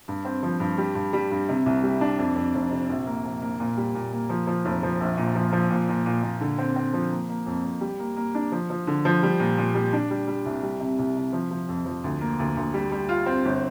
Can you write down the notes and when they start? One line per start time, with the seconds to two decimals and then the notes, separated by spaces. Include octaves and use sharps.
0.08 G2
0.25 C4
0.43 F3
0.60 G2
0.78 G3
0.95 G2
1.13 G3
1.31 G2
1.49 C3
1.66 C2
1.83 G3
2.01 D4
2.18 F2
2.36 F2
2.54 F1
2.71 C3
2.89 A#1
3.06 A#3
3.25 A#1
3.42 A#3
3.60 A#2
3.77 G3
3.95 A#2
4.13 A#3
4.29 F3
4.47 F3
4.65 F1
4.83 F3
5.01 A#1
5.17 A#2
5.35 F3
5.52 F3
5.70 A#2
5.89 A#2
6.06 A#2
6.23 A#2
6.41 D3
6.58 C4
6.76 C4
6.93 F3
7.11 A#3
7.29 A#3
7.46 F2
7.64 F2
7.81 G3
7.99 A#3
8.16 A#3
8.35 D4
8.52 F3
8.70 F3
8.87 D3
9.05 F3
9.23 G3
9.40 A#2
9.58 A#2
9.74 G3
9.93 D4
10.10 G3
10.28 G3
10.46 C2
10.63 G3
10.80 C3
10.99 C2
11.16 C3
11.33 F3
11.51 F3
11.68 F2
11.86 F3
12.04 D2
12.21 A#3
12.39 D2
12.57 D2
12.74 G3
12.92 G3
13.09 F4
13.26 C4
13.45 G1